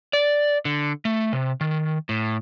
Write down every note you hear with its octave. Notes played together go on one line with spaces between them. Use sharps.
D5
D3
A3
C3
D#3
A2